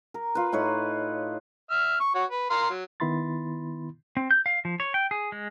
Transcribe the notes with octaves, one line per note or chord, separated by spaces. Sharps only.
A#4
F4 B4
A2 D#4 B4 C#5
E5 F6
C#6
F#4 C#5
B4
A#4 F5 C6
F#3
D#3 B3 E4 B5 C6 A6
C4
G6
F5
F3
C#5
G5
G#4
G#3